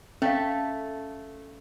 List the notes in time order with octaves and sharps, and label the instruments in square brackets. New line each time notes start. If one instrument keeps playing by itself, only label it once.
[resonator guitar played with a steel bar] A3 [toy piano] C#4 F5